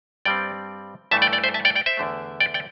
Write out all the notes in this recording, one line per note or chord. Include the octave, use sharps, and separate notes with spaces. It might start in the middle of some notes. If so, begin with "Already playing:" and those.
G2 G3 C4 D5 G5
G2 E3 A3 E5 A5
D5 G5
D5 G5
C5 E5
E5 A5
D5 G5
D5 G5
C5 E5
E2 D3 A3
D5 G5
D5 G5